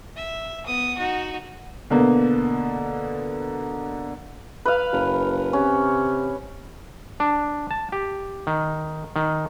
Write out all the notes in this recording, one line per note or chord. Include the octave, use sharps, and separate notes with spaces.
E5
B3 D#6
D#4 F#4
B2 D3 A#3 B3
B4 F5
F#1
C3 C#4
D4
A5
G4
D#3
D#3